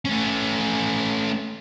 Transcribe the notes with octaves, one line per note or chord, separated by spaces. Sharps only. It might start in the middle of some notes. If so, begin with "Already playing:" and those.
A3 C#4